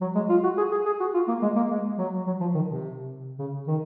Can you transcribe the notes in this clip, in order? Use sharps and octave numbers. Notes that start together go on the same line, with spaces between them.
F#3
G#3
F4
F#4
G#4
G#4
G#4
F#4
F4
A#3
G#3
A#3
G#3
F#3
F#3
F3
D#3
C3
C#3
D#3